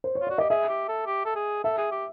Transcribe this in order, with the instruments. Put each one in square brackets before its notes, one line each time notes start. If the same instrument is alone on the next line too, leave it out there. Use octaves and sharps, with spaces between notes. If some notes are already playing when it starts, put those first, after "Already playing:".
[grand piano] C5
C#5
[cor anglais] F4
[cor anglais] F#4 [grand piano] D5
[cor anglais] G4 [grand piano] D#5
[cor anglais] G#4 [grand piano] E5
[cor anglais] G4
A4
G4
A4
G#4
[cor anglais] A4 [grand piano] E5
[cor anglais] G#4
G4